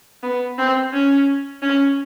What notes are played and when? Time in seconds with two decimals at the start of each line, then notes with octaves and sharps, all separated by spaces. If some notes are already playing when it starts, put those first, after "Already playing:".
0.23 B3
0.58 C4
0.93 C#4
1.62 C#4